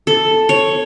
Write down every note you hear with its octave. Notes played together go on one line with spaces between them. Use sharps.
A4
C#5